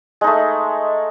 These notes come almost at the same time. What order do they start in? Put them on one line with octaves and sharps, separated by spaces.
G#3 D#4 A3